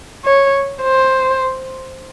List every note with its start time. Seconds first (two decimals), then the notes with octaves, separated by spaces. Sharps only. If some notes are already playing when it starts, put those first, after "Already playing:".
0.24 C#5
0.82 C5